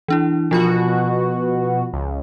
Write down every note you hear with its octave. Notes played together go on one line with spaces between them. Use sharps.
E3 D4 E4
B2 F3 F4 F#4 B5
C#2